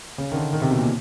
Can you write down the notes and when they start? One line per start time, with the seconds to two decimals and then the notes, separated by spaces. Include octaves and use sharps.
0.18 C#3
0.32 D#3
0.36 D3
0.53 D#3
0.62 C3
0.71 B2
0.79 A#2